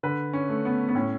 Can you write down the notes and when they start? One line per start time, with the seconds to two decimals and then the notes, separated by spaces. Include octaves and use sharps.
0.03 D3 B4
0.33 C#4
0.49 A3
0.65 B3
0.89 B3
0.95 A2 C#4